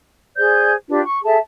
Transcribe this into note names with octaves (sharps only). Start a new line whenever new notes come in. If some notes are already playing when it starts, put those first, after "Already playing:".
G#4 C5 D5 G6
D4 F4 G4 B4
C#6
G#4 A4 E5 A5